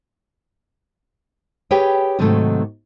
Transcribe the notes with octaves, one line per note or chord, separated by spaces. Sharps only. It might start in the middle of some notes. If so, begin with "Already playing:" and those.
G4 G#4 B4 C#5 G5
G#2 C3 D#3 F#3 G#3 A3